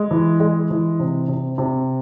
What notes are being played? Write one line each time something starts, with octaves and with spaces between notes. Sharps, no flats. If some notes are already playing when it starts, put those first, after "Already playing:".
Already playing: G#3
E3
G#3
E3
C3
C3
C3